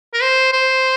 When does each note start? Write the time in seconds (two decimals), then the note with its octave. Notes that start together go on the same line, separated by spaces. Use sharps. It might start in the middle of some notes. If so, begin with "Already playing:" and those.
0.14 A#4
0.22 C5
0.53 C5